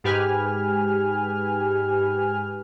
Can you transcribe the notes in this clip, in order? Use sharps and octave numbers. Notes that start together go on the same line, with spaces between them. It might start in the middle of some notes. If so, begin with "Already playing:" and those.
G#2 G4 B4 G#5 F6